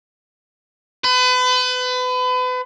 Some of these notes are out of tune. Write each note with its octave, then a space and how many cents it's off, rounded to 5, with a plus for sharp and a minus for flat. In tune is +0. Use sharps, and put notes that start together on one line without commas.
B4 +35